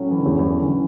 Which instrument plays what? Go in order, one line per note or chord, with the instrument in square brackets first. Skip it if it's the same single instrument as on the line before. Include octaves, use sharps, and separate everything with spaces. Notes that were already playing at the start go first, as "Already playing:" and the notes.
Already playing: [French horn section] A2 F#3 C#4
[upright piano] E3
D3
E2 E3
E2 E3
D3
E3